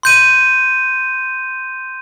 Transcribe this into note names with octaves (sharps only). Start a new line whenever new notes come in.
C6 G6 D#7